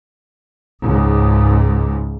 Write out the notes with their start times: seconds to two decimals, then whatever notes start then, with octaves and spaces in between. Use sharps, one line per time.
0.83 C#2 G#2